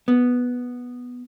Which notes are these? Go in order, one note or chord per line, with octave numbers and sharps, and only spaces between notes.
B3